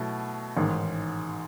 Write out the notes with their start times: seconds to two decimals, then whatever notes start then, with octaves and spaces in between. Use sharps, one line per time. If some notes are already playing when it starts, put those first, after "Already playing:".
Already playing: B2 F#3 A3 E4
0.57 A1 G#2 D#3